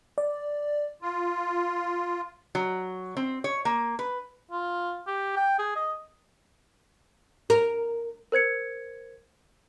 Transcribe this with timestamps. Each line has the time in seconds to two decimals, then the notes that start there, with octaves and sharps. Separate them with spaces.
0.18 D5
1.02 F4
2.55 F#3
3.17 C4
3.44 C#5
3.65 A#3
3.99 B4
4.51 F4
5.07 G4
5.37 G5
5.59 G#4
5.76 D#5
7.50 A#4
8.32 A#4 C5 G#6 C#7